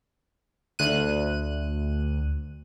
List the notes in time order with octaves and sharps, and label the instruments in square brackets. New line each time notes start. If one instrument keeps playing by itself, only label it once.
[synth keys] D2 F#6 D#7